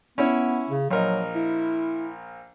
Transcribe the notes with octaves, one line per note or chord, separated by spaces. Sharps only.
B3 C#4 E4 C#5
C#3
A#1 F#3 A#4 D#5
E4